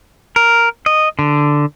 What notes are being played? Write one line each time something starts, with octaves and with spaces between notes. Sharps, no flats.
A#4
D#5
D3